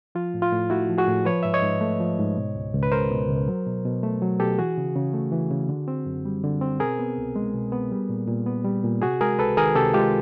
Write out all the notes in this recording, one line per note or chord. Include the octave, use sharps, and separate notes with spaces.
F3 F4
A2
F4
A2
A3 E4 F#4
F3
F#4 G#4
A2
F3 B4 C#5
G#2 E5
C#5 D#5
G#2
A3
F3
G#2
B2
C#2
C#2
B4
G#3 A#4 C5
B2
C#2
F#3
B2
B2
A3
F#3
B2 G4 A4
E3 F#4 G#4
C#3
C#3
A3
E3
C#3
D3
C4
F#2
G3
D3
C4
B2 G#4 A#4
B3
C2
G#3
B2
B3
G3
A#2
A#2
B3
G3
A#2
C3 F#4 G#4
G#3 G#4 A#4
C#2 A4 B4
D#3 G#4 A#4
C3 G4 A4
G#3 F4 G4